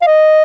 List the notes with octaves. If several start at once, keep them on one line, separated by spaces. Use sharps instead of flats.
F5
D#5